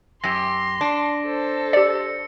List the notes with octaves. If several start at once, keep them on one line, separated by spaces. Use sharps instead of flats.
F#2 G4 C6 A#6
D4
A4 C5
G4 D5 E6 C#7